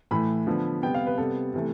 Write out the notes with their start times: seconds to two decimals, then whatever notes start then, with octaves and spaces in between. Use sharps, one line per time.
0.11 A2 E3 A3 B5
0.47 D3 F3 B3
0.82 C3 G3 B3 G5
0.94 F5
1.07 B4
1.18 C3 G3 B3 A4
1.54 C3 E3 A3